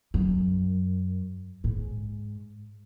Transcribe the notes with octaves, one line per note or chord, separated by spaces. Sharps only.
F#2
G#2